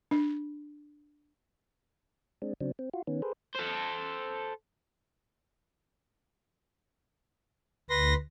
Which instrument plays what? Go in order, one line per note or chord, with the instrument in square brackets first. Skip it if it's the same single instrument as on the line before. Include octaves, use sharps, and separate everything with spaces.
[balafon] D4
[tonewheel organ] G#3 C4 D4
C#3 F#3 C4 D4
C4
F4 F#4
D#3 B3 C#4
G#4 A4 B4 C5
[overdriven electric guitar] A4 C5
[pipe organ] D2 A#6 [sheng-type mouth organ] B4 C6